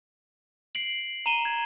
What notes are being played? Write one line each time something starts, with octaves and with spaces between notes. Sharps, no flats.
C7 D7 F#7
A#5 D#7 E7 G7
G#6